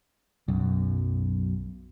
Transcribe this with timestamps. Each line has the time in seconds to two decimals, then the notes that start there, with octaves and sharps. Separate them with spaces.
0.48 B1 F#2